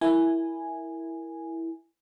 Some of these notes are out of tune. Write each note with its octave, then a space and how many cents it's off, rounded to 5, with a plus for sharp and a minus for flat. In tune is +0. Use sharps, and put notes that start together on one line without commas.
E4 +0 A#4 +0 G#5 -5